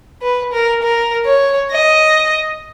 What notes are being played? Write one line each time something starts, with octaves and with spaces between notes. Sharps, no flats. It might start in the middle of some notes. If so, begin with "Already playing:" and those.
B4
A#4
A#4
C#5
D#5